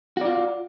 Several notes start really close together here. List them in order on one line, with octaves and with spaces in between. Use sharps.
F#4 D5 F4